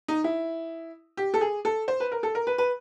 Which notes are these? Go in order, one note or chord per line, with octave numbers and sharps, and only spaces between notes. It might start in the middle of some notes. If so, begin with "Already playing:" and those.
D#4
E4
G4
A4
G#4
A4
C5
B4
A#4
A4
A#4
B4
B4